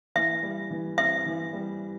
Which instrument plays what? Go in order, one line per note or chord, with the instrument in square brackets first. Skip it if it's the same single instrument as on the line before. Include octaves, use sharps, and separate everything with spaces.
[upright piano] E3 [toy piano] E5
[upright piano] G3
E3
[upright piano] C4 [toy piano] E5
[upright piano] E3
G3